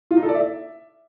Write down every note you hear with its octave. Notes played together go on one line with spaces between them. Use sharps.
F4
D#4
A4
D5
E5